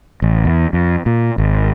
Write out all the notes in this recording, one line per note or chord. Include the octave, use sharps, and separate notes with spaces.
A1
E2
F2
A#2
G#1